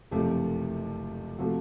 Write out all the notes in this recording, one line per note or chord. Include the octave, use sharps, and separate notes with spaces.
F#1 F2 C3 F3 A3 G4
C3 F3 A3 F#4